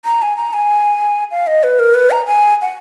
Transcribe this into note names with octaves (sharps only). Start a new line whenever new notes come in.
A#5
G#5
A#5
G#5
F5
D#5
B4
A#4
B4
A#5
G#5
F#5